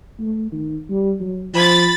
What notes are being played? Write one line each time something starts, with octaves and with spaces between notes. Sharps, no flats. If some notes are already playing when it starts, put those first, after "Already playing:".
A3
D#3
G3
F#3
F3 B5 A6